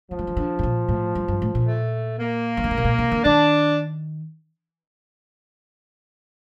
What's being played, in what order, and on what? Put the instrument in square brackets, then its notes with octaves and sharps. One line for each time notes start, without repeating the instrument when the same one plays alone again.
[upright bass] D#3 [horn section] F3
[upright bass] D3
D#3
D3
A2
A#2
A2
G2
G2
A2
A#2
[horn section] A3
A#3
[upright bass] F3
D#3
D3
C3
A#2
C3
D3
[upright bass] D#3 [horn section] D4